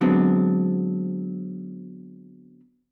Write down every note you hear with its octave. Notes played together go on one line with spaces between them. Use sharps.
D3 F#3 G#3 B3 C4 D4